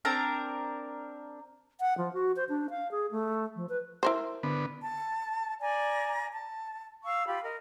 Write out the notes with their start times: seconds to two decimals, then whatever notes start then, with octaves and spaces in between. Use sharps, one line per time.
0.05 C4 D4 A#4 A#5
1.80 F#5
1.98 F3
2.13 F#4
2.36 C5
2.49 D4
2.70 F5
2.91 G#4
3.11 A3
3.56 F3
3.69 B4
4.03 E4 A#4 C5
4.43 D3 B3
4.83 A5
5.60 D5 G#5 A#5
6.32 A5
7.05 F5 C#6 E6
7.26 F4 G4 B5
7.43 A#4 D#5